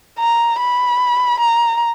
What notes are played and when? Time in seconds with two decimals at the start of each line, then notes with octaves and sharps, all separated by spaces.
0.19 A#5
0.60 B5
1.40 A#5